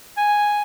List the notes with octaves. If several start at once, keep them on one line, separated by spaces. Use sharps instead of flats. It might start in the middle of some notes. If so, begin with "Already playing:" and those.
G#5